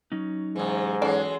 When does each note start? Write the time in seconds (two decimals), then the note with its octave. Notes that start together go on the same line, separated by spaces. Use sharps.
0.12 F#3 C#4 D#4
0.56 G#2 C3 E3
1.02 E3 F#3 G#3 C#4 A4 D5